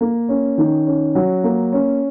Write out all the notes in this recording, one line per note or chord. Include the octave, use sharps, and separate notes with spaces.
A#3
C#4
D#3
C#4
F#3
A#3
C#4